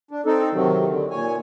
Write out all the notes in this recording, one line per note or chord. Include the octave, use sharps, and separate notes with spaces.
D4
C4 D#4 A4
C3 D#3 F#3
D3
A#2 C#5 G#5